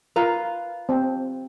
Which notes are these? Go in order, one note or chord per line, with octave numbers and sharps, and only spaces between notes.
F4 A#4 B4 A#5
C4